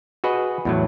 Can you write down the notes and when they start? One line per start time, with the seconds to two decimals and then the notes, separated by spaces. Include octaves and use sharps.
0.24 F#4 G#4 B4 D#5
0.65 E2 A2 F#3